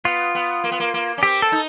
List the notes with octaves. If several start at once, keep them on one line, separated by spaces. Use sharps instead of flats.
B3 F4
B3
A#3
B3
A#3
A#3
C#4
C4 G4
A4
D#4